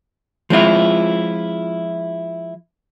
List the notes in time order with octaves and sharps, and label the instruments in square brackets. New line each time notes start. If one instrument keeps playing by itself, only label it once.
[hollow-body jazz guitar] F3 G#3 C4 E4 F4